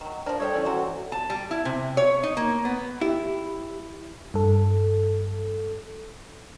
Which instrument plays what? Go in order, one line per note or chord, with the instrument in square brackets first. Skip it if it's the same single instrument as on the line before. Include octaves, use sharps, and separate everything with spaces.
[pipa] D#3 F#3
[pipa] F3 A#4 [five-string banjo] D4 [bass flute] C5
[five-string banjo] G3 [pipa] G#4 E5 G5 [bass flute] A4 [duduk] C#5
[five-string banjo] E3 C#4 D5
[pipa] C3 C5 [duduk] F#4
[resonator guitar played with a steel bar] A5
G3
E4
C3
C#5
D#4
A#3
B3
[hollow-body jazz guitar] E4 [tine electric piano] G4
[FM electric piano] G2 A4